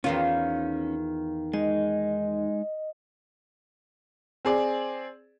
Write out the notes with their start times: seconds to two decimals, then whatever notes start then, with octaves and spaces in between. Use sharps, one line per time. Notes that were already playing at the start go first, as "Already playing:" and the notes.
0.04 E2 D#3 C#4 F4
1.53 G#3 D#4 D#5
4.45 C4 G#4 D5